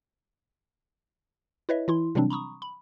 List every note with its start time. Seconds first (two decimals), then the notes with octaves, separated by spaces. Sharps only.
1.69 E4 B4 C#5 D#5 E5
1.88 E3 E4 C6
2.15 C3 E3 F#3 G3 C4 D4
2.30 A#5 B5 C#6 D#6
2.62 B5